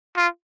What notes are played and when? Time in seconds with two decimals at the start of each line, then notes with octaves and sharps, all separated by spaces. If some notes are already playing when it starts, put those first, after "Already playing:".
0.17 F4